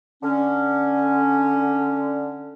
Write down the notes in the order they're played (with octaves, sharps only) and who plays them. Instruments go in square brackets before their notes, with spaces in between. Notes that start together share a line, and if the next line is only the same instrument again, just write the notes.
[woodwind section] D3 C#4